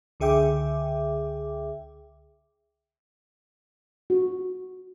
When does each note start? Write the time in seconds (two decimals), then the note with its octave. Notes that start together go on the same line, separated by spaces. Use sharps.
0.20 C#2 D3 G#4 E5 G5 D6
4.10 F#4